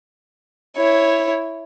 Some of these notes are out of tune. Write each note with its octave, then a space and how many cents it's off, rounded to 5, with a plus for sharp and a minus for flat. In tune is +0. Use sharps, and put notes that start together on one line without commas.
E4 +0 C#5 +0